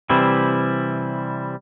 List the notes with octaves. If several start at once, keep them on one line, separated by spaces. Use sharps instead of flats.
C3 E3 G3 C4 E4